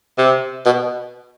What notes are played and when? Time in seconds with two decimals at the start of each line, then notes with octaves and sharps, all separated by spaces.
0.18 C3
0.66 B2